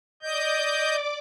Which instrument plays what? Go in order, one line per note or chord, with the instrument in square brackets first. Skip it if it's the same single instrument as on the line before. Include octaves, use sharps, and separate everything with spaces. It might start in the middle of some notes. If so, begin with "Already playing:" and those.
[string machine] D5 D6 [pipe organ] D#5 G6